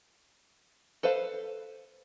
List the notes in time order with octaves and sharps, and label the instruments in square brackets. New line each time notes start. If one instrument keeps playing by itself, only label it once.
[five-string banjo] A4 B4 C5 F5